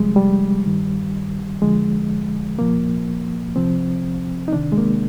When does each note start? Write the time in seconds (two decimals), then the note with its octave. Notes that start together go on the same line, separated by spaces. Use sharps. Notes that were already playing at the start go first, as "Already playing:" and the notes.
Already playing: C2 C3 F3 G3 G#3
0.16 G3
0.66 G2 D#3
1.62 F2 D3 F3 G#3
2.58 C2 A#2 F3 A#3
3.56 C2 C3 F3 C4
4.48 D#4
4.53 C2 C3 D#3 D4
4.72 G#3
4.78 A#3